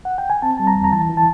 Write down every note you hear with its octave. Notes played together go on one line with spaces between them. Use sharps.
F#5
G5
G#5
C4 A5
G3 A5
A#5
E2
A#5
E3 A5
E3
A5